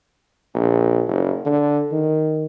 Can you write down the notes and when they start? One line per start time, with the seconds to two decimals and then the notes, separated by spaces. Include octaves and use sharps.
0.55 A#1
1.08 F#1
1.46 D3
1.92 D#3